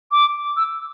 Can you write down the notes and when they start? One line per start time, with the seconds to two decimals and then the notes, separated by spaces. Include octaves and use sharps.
0.12 D6
0.57 E6